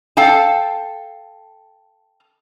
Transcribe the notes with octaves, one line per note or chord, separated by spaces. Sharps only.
A4 F5 G5 A5